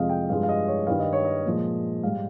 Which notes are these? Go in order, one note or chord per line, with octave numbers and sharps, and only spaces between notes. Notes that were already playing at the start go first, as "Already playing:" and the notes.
Already playing: F2 C3 F3 G#3 D#5 F5
G5
G2 F3 G#3 F5
F5
D#5
C#5
G2 D#3 G3 F5
D#5
C#5
D#5
A#2 F3 G#3
G#2 G3 F5